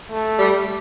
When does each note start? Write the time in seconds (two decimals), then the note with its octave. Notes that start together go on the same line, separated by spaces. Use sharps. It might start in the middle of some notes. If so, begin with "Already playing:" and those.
0.11 A3
0.39 G3